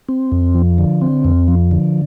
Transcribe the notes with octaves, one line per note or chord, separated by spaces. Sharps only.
C4
F2
F3
D3
C4
F2
F3
D3